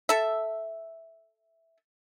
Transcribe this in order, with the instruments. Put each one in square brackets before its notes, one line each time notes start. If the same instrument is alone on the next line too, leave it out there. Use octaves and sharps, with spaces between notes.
[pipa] A4 E5